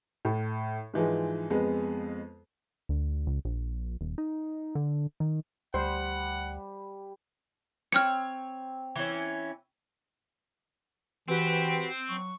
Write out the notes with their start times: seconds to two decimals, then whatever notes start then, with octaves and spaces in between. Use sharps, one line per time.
0.25 A2
0.94 G#2 E3 F3 G#3
1.50 F2 G#3 B3
2.89 D2
3.27 C#2
3.45 A#1
4.01 D#1
4.18 D#4
4.75 D3
5.20 D#3
5.74 D2 G3 C5 F#5
7.92 C4 C#5 F6 C#7
8.96 E3 C#4
11.28 E3 C4 F#4 G4 B4
12.10 F#3 C#6